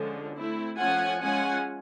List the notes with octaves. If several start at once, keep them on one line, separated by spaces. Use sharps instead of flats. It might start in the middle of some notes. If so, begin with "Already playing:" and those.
Already playing: D3 F3 G#3 C#4
A3 C4 E4
F3 A3 C#4 F4 F#5 G#5
G#3 C#4 F4 F#5 G#5